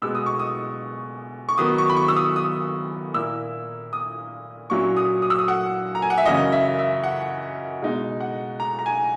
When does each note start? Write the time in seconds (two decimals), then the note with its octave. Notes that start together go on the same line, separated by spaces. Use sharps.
0.02 B2 G#3 B3 E6
0.15 D#6
0.26 C#6
0.39 D#6
1.49 C#6
1.58 D#3 F#3 B3 D#6
1.78 C#6
1.90 B5
1.97 C#6
2.08 E6
2.16 D#6
2.36 D#6
3.14 A#2 A#3 E4 E6
3.93 D#6
4.70 A#2 F#3 C#4 E4 C#6
4.97 D#6
5.22 D#6
5.30 E6
5.39 D#6
5.48 F#5
5.95 A#5
6.02 G#5
6.10 F#5
6.18 E5
6.26 F#2 C#3 E3 A#3 C#4 D#5
6.52 E5
6.79 E5
7.04 F#5
7.82 B2 G#3 D#4
8.20 F#5
8.60 A#5
8.79 A#5
8.86 G#5